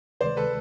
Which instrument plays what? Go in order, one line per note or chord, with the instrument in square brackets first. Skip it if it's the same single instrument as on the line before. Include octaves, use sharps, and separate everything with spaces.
[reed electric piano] D2 C3 D#3 G#3 [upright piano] C5 D5
[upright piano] A4 B4